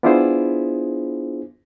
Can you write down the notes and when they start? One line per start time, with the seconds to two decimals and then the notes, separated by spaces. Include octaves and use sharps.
0.03 B3 D4 E4 F4 G#4 C5